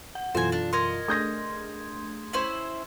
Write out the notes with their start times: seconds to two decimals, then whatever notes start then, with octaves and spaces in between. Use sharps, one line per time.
0.15 F#5
0.35 F#2 B2 E3 F4 A4 C5 G#5
0.52 D4
0.73 A#4 D#5 C6 G#6
1.08 A3 D4 G#4 D#6 G6 A#6
2.33 C#4 E4 C5